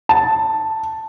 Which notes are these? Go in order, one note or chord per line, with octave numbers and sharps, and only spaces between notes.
A5